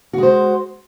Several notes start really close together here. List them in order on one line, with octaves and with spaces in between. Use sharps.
F#4 G#3 C5